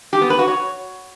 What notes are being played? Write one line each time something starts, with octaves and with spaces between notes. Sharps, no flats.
G4
B3
B4
F#4
C#5